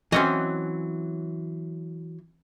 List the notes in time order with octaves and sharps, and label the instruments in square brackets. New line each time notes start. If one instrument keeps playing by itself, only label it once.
[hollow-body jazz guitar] E3 F#3 [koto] C4 C#4 D#5